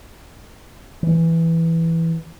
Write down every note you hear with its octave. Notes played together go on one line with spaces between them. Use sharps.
E3